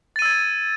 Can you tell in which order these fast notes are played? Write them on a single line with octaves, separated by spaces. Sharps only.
A6 D#7 E6 G#6